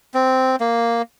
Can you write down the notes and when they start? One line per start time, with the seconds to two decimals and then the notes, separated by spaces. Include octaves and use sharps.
0.14 C4
0.60 A#3